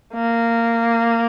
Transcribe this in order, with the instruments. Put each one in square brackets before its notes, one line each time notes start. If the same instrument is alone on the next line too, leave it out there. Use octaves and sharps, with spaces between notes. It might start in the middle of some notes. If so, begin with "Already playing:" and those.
[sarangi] A#3